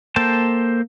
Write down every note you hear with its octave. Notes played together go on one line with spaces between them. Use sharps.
A#3 A4 C5 G5 A5